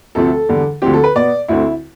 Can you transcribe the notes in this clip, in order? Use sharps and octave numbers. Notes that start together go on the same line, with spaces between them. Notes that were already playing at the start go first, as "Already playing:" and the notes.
D2 C3 F3 A3 C4 A4
E2 D3 G3
D2 D3 F3 C4 G4
A4
B4
B2 B3 D5
D2 D3 A3 C4 E4